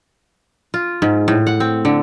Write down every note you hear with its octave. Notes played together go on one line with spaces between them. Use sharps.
F4
G#2
A2
F#5
C4
D3